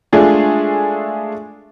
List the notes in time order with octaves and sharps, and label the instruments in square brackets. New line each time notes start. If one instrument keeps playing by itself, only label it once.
[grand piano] G#3 A3 D4 F4 G#4